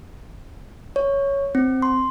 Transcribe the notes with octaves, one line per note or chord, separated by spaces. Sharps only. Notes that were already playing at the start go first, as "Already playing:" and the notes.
C#5
C4
C6